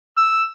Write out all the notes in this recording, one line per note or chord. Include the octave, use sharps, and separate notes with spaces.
E6